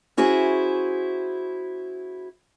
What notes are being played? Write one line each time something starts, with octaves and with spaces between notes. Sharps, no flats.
C#4 E4 F#4 G#4 C5